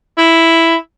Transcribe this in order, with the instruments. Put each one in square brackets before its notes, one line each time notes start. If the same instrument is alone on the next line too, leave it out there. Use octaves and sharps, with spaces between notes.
[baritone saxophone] E4